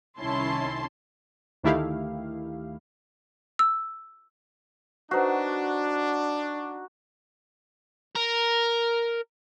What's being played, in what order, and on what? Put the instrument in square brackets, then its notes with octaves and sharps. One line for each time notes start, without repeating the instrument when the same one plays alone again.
[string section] C2 D#3 C#4 E4 A5 C6
[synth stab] D2 D#3 A3 E4 G4 F5
[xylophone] E6
[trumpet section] D4 [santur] D#4 F#4 [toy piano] B4 C5 F#5
[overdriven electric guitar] A#4